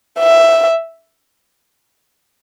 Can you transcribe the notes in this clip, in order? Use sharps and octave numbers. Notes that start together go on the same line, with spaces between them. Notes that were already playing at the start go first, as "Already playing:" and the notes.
E5